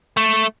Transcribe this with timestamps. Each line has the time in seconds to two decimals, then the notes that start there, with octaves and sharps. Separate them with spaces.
0.17 A3